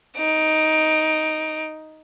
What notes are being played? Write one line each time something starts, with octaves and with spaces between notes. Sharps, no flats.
D#4 D7